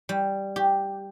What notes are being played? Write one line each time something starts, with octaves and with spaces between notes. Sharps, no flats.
G3
G4